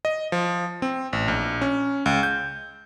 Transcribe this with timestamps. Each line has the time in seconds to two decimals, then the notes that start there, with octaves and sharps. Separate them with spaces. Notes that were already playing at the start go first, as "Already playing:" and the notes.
0.05 D#5
0.32 F3
0.82 C4
1.13 A1
1.28 A#1
1.61 C#4
2.06 C#2
2.23 G6